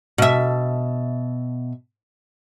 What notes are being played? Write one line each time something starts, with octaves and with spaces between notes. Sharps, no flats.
B2 E5